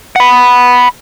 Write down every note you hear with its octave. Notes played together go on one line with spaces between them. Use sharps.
F#5 B5